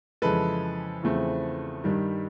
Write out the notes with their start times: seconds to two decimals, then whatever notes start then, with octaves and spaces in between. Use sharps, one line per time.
0.22 F2 C#3 E3 G#3 A4 B4
1.03 E2 C#3 F3 A3 C4
1.84 G2 D#3 G3